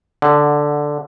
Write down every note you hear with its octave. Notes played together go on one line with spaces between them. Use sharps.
D3